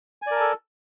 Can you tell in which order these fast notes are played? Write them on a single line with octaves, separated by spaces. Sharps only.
G#5 D5 A#4 A5 A4